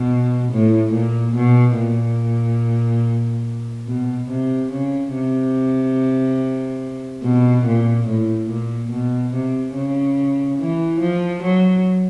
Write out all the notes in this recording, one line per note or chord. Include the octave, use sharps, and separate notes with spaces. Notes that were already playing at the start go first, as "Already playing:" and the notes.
Already playing: B2
A2
A#2
B2
A#2
B2
C3
C#3
C3
B2
A#2
A2
A#2
B2
C3
C#3
E3
F3
F#3